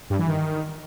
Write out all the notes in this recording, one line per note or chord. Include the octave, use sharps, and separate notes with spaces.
G2
E3
D#3